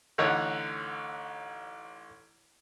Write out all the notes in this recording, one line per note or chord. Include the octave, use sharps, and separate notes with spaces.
A1 D3 D#4 C#5 F#5